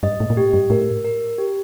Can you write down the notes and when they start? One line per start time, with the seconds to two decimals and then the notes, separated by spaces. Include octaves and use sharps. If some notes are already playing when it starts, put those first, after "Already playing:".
0.03 G2 D#5
0.20 A2
0.30 A#2
0.36 A2 G4
0.53 G2
0.70 A2 A#4
1.04 A#4
1.38 G4